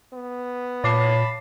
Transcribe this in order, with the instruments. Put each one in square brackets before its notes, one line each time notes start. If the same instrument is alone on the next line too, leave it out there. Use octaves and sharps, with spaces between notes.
[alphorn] B3
[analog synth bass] A#2 [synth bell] C#5 D6 C7 [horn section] A5 B5